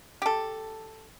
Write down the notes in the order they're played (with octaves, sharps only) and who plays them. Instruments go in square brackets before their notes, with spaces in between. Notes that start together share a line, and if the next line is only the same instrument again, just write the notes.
[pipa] G4 A4